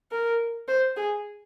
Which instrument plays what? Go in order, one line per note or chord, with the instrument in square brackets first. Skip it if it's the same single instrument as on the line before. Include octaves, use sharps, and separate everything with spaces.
[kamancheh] A#4
C5
G#4